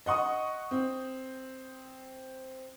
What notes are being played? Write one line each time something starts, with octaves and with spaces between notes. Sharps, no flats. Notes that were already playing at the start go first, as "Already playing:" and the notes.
D#5 F#5 C#6 D#6
C4